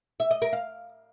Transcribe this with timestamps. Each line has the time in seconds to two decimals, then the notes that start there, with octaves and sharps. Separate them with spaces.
0.20 E5
0.31 D#5
0.42 A#4
0.53 F5